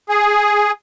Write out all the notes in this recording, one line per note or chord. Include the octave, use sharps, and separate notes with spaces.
G#4